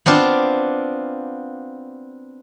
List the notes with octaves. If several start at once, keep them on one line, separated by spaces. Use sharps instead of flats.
B3 C4 D4 F4